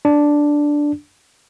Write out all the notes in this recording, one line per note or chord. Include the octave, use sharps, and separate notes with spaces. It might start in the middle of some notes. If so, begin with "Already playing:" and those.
D4